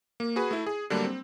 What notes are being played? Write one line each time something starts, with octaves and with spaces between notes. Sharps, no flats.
A#3
F#4 G#4 B4
A3 E4
G#4
D3 F#3 G3 A3 A#3 D4
C4